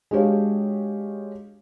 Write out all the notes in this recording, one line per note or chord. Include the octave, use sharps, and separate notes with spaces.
G#3 D4 F#4 G4 C#5 F5